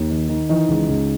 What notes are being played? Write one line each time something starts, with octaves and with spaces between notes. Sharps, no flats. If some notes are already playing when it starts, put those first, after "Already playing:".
Already playing: D#2
D#3
D#3
E3 D#4
C#2
C#2